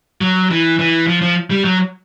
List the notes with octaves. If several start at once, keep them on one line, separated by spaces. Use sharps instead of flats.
F#3
E3
E3
F3
F3
G3
F#3